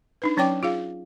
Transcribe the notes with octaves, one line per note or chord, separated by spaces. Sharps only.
D4 D#4 B4
F#3 C#4 C#5 G5 D6
F4 G#4 F5